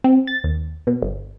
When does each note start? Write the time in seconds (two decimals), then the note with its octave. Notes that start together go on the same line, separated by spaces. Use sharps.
0.04 C4
0.27 A6
0.44 D#2
0.87 B2
1.02 G1